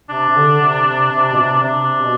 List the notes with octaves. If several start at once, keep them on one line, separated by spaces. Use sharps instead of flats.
C3 D4
C3
D3
C3
C3
C3
B2
C3
C3 D4
B2